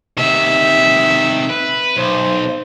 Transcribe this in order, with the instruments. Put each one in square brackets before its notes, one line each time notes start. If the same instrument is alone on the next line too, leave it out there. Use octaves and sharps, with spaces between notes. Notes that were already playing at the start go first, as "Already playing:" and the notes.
[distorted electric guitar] C3 D#3 [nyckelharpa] E5
[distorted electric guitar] B4
[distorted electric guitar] B1 [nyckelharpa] C5